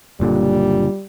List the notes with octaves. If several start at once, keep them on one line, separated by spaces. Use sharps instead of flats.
F#1 A#2 D3 G3